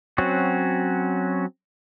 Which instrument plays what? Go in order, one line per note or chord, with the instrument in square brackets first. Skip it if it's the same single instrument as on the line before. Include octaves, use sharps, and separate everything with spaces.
[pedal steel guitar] F#3 C4 C#4 F#4